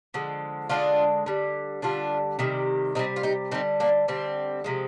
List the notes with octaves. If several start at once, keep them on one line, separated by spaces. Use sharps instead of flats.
D3 F3 G#3
D3 F3 G#3 D4 F4
D3 G3
D3 G3 D4 F4
C3 D#3 G3
C3 D#3 G3 C4 D#4
F4
D#4 G4
D3 G3 C4 D#4
A#3 D4
D3 G3 C4
C3 F3 G#3